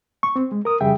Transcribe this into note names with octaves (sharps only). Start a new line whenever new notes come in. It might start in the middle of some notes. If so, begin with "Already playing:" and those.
C#6
C4
G#3
A#4 D#6
F2 C#3 G3 G#4 E5 G5